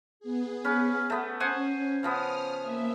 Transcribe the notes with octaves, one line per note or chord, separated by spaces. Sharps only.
B3 G#4
C#4 B4
A3 B3
C#4 C5 F#5 G#5
C#3 F3 B3 D#6 F6
A#3 E5